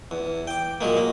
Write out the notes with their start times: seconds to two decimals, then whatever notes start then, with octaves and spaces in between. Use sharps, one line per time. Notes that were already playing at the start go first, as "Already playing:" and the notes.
0.11 E2
0.47 G5 D6
0.81 A#2 F#3 G#3 A#3
0.97 A#3